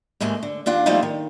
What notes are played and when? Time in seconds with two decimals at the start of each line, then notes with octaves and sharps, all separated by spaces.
0.20 D#2 G#2 G#3 A3 G#4
0.43 D3
0.66 D#2 D4 F4 F#5
0.86 F3 G3 A3 C4 D#4 F4
1.03 D#3